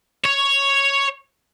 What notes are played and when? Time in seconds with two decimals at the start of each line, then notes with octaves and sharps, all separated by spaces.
0.24 C#5